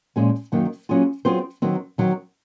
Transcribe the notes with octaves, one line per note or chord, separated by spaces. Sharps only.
A#2 F3 G#3 C#4 G#4
F#2 D#3 F#3 A#3
F#3 A#3 C#4 F4 G#4
F#3 C4 F4 G#4 C5
D#3 F#3 C4
D#3 F#3 C4